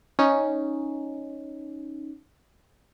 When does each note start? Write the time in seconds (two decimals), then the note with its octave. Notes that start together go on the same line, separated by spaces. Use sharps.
0.19 C#4 D#4